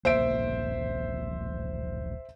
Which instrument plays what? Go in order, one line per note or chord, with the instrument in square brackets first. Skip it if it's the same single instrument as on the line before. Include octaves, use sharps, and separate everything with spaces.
[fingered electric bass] D1 A#1 A#3 [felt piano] C5 E5 D7